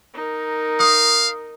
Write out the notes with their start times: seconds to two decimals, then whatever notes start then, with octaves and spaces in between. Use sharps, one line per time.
0.14 D#4 A#4
0.80 F5 D#6